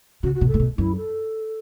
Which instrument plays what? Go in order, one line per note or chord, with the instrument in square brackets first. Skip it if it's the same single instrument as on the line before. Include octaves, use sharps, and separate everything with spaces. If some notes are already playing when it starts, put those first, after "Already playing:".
[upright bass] C#3 [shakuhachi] F#4
[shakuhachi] F#4
[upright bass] B2
[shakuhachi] A4
[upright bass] A2
B2
[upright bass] F#2 [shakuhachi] E4
[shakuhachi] A4